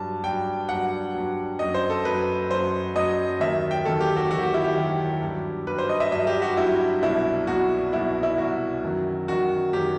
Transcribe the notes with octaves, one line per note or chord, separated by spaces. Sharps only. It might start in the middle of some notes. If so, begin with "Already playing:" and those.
Already playing: G2 F#3 A5
G2 F#3 G5
G2 F#3 F#5
G2 F#3
F#2 F#3 D#5
C5
A4
F#2 F#3 B4
F#2 F#3 C5
F#2 F#3 D#5
D#2 D#3 F#3 E5
G5
D#2 D#3 F#3 A4
G4
F#4
D#2 D#3 F#3 F#4
G4
E4
G4
D#2 D#3 F#3
G2 F#3
G2 F#3 B4
C5
D#5
E5
G2 F#3 E5
G4
F#4
G2 F#3 E4
C2 B2 F#3 E4
C2 B2 F#3 F#4
C2 B2 F#3 E4
E4
C2 B2 F#3 F#4
F#2 D#3 F#3
F#2 D#3 F#3 F#4
F#2 D#3 F#3 G4